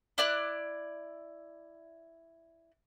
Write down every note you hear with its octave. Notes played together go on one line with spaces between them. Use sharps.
E4 D5 F#6